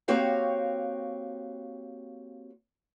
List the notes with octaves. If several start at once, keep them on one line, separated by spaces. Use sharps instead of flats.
A#3 C4 F#4 G4 C#5 F5